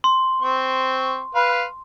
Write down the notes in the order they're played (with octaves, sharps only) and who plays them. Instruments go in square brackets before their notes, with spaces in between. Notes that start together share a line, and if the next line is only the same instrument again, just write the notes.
[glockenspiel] C6
[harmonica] C4 C#6
B4 F5 B5